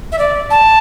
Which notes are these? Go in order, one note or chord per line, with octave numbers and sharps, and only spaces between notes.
E5
D5
A5